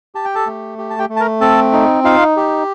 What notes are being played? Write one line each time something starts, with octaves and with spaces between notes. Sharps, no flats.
G4 A5
G5
A4 A5
A3
G4
A5
G4 G5
A3
A5
A#4 A#5
C4 A4 A5
D#4
D#4 F4 F5
G4